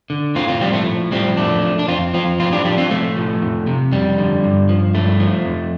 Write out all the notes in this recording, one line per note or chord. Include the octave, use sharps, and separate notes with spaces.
D3
A2 C4 F4
C4 F4
F3 G3 C4
A3
A2
F3 G3 C4
F2 A3 D4
F3
D4
F2 C4 F4
F3 C4 F4
A2 C4 F4
D4 G4
F3 D4 G4
C4 F4
A2 A3
F3
F2
C3
F2 G3
D3
G2
F3
G2 A3
F3
F2